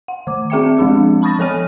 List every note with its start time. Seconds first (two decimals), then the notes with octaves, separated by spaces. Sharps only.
0.08 F#5
0.27 D#3 D6
0.50 C4 G#4 E5 G5 D6 C#7
0.78 F3 G#3 C4 D4 G4
1.22 A5 B5 C#6 D#6 A6 A#6
1.39 F3 A4 C#5 G#5 F6 D#7